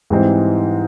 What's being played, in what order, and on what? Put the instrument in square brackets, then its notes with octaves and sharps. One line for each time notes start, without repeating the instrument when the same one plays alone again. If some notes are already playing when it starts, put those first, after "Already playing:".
[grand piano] G#2 E3 G3 C4 D#4